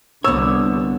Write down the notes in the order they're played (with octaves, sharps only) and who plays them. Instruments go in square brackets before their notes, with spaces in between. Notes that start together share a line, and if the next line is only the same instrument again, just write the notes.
[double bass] C2 D3 [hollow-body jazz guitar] B3 C#5 [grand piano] E6